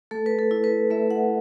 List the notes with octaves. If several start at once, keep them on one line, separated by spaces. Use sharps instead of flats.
A3 A4
B4
A4
E4
B4
A3 E5
F#5